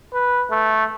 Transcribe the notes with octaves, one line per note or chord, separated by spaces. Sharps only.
B4
A3